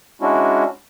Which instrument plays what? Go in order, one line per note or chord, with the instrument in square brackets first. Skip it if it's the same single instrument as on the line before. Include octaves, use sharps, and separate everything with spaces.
[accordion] G#3 C#4 D4 E4 F#4